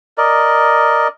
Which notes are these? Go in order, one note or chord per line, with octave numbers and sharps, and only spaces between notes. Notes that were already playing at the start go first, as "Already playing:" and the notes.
A#4 D5 D#5